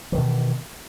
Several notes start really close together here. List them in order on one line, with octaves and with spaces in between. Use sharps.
E3 D#3 B2